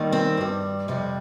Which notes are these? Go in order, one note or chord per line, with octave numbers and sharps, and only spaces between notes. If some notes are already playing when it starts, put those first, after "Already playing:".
Already playing: D#2 D#3 G3
C4
G2 G3
F2 C3 G3